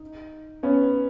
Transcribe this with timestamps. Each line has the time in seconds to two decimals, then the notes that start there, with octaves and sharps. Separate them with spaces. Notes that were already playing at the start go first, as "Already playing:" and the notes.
Already playing: D#4
0.63 B3 C#4